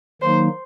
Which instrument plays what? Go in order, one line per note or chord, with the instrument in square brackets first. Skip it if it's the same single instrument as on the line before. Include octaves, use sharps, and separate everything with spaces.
[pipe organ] D#3 F#3 A#3 D#4 [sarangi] C5